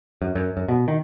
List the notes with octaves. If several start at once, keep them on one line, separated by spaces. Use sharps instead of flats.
F#2
F#2
F#2
B2
D#3